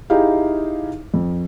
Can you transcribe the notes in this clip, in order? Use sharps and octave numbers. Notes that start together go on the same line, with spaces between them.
D#4 E4 G4 G#4 F5
F2